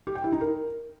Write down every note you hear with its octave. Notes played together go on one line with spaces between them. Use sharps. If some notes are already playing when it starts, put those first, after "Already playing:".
G4
G5
E4
D#4
A#4